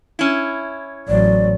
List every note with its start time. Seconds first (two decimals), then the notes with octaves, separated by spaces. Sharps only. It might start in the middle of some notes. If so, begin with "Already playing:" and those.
0.19 C#4 E4
1.08 A1 F#3 D5